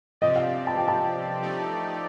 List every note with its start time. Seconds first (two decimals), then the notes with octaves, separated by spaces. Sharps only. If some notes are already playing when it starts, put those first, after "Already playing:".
0.21 C3 F3 C4 G4 D5 D#5
0.36 F5
0.67 A5
0.77 G5
0.88 A5
1.41 F3 A3 D#4 G4 D5